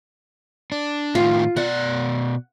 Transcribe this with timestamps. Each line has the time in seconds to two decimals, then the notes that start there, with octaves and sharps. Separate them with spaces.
0.72 D4
1.15 A2 D#3 F4
1.57 B2 D5 F#5